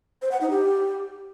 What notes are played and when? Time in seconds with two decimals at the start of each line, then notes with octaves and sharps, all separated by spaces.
0.22 C5
0.31 F#5
0.41 D#4
0.50 G4